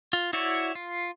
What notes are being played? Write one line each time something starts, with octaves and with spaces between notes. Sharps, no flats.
F4
E4 F#4 C#5 D5 E5
F4